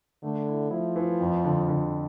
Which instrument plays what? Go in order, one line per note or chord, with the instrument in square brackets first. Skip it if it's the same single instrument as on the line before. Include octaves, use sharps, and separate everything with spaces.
[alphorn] D3 [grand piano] A3
[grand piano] E4
[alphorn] F3 [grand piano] E4
[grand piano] E3
F2
D3
D3